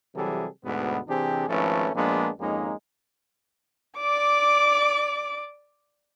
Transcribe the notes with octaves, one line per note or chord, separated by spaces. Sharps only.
C3 E3 F#3 G3 G#4 A4
D2 G#2 B2 B3
C3 E3 C4 D4 G4 G#4
G#1 F3 A3 C#4 A4 B4
A#1 F3 G#3 A#3 B3 D4
G#1 F2 G#3 A#3 C#4 D#4
D5 D6